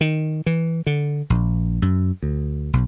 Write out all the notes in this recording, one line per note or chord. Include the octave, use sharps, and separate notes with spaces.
D#3
E3
D3
A#1
F#2
D2
B1